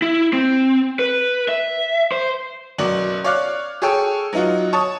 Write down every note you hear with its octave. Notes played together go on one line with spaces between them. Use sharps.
E4
C4
B4
E5
C5
F#1 B2 F#3 F#4 D5 F#7
C#5 D5 F5 D6 F6 F#6
G#4 A4 C#5 G5 E6
F#3 B3 D#4 F4 F#4
C#5 A5 C#6 D#6